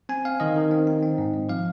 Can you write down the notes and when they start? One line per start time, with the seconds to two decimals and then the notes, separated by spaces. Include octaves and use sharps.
0.09 C4 G#5
0.25 C4 F5
0.40 D#3 D#5
0.56 D#3
0.71 C4
0.87 D#4
1.03 C4
1.18 G#2
1.34 G#2
1.49 F3 F5